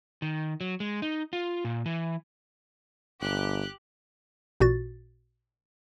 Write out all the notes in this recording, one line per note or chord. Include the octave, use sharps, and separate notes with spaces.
D#3
F#3
G#3
D#4
F4
A#2
E3
G1 G4 F#6
A1 A#2 F#4 A6